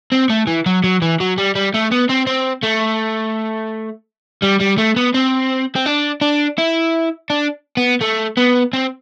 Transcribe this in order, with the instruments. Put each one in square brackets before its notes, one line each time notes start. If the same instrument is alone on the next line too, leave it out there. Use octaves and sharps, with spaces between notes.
[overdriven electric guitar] C4
A3
E3
F#3
F#3
E3
F#3
G3
G3
A3
B3
C4
C4
A3
G3
G3
A3
B3
C4
C4
D4
D4
E4
D4
B3
A3
B3
C4